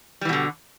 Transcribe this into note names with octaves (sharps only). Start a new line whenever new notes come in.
B2 D3 E3 G3